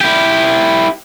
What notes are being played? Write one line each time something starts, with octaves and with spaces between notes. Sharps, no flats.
E4 G4